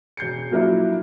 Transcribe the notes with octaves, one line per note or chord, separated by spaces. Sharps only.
E1 G6 C7 C#7
F3 F#3 A#3 D4 E4